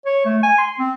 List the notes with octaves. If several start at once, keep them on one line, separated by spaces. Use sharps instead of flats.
C#5
A3
G#5
C6
C4